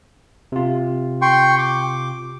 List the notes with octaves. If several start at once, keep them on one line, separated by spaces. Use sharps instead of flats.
C3 F4
G5 C6 C#6
D6